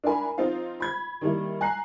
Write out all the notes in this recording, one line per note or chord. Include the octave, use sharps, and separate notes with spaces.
D4 E4 A#4 G#5 B5
F3 C4 D#4 F4 C5 F5
B5 G#6
D#3 E3 G3 A#3 E4
G#5 A#5 F#6 C7